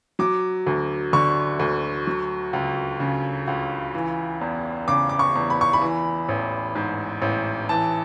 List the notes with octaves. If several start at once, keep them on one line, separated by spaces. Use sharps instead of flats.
F#3 D6
D2
D3 C#6
D2
F#3
C#2
C#3
C#2
E3
E2
C#3 D6
D6
C#6
E2
B5
C#6
B5
E3
A1
G#2
A1
E3 A5